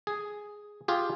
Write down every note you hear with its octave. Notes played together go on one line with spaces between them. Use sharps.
G#4
F4 G4 G#4